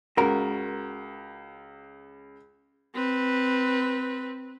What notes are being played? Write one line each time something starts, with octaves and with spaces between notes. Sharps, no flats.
C#2 F#4 A#4
C4 B4